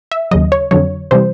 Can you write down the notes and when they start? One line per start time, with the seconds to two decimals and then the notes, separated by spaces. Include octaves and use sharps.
0.12 E5
0.31 D#2 C#3 F#3 D#5
0.52 C#5
0.71 F2 D3 F#3 C#5
1.11 C3 E3 G3 C5